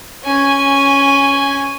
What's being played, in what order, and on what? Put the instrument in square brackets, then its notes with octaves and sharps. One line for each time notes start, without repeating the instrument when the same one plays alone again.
[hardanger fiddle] C#4 G#5